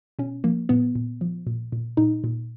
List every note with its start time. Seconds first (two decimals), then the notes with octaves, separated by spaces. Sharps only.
0.19 B2 C#4
0.44 F3 A#3
0.69 A#2 B3
0.95 A#2
1.21 F3
1.47 A#2
1.72 A#2
1.97 A#2 D#4
2.24 A#2